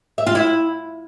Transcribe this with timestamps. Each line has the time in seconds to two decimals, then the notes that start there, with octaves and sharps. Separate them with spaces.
0.18 E5
0.27 F4
0.35 E4